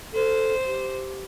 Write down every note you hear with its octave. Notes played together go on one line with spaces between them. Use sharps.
A4 C5
G4